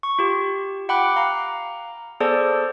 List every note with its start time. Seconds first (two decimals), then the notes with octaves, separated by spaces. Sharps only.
0.03 C#6
0.19 F4 G4
0.89 F#5 G5 B5 D6 F#6
1.16 F5 A#5
2.20 B3 G#4 A4 C5 D5 A5